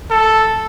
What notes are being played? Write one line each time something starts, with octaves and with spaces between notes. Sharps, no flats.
A4